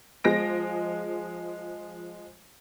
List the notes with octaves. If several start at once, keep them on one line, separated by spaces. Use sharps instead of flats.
F3 G#3 A#6 D7